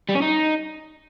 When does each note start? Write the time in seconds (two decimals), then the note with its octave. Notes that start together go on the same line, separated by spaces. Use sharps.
0.09 G3
0.16 C#4
0.22 D#4